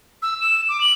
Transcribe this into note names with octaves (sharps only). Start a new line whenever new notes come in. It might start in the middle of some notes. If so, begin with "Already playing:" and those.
E6
E7
D6
F#7